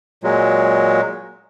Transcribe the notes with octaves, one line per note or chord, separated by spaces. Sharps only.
A#2 F#3 G#3